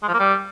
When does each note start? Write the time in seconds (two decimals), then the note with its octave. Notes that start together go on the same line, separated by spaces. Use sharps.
0.03 G#3
0.08 F3
0.14 A#3
0.19 G3